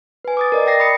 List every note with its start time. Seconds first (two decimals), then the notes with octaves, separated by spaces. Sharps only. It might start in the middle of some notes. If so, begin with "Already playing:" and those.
0.25 B4 G#5
0.37 D6 D#6 A6
0.52 A#4 D5 D#5
0.66 D5 G5 A#6 C7
0.80 B5 D#6 C#7